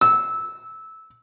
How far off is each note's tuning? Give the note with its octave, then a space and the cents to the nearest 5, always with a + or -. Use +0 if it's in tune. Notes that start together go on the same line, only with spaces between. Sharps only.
E6 -15